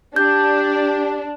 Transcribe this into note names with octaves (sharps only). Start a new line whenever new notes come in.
D4 G4 G6